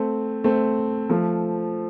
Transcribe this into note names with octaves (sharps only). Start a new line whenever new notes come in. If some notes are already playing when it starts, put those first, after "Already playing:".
Already playing: A3 C4
A3 C4
F3 A3